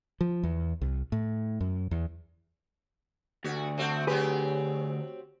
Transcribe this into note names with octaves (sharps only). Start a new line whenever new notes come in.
F3
E2
C2
A2
F#2
E2
D2 F#4
A3 C4 F#4
F#3 C4 G4 G#4 B4